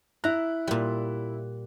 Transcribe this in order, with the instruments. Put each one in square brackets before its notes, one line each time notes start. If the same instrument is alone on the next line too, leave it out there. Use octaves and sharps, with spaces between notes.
[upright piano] E4 F#6 [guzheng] A#5
[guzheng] A#2 G3